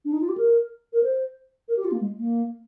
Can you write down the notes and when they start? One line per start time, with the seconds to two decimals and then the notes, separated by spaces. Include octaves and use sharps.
0.05 D4
0.13 D#4
0.21 F4
0.29 G4
0.37 A#4
0.93 A#4
1.03 C5
1.68 A#4
1.77 G4
1.85 F4
1.92 A#3
2.01 G#3
2.17 A#3